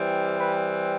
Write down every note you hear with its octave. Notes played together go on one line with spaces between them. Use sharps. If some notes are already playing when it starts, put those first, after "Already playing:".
Already playing: E3 G3 C4
B4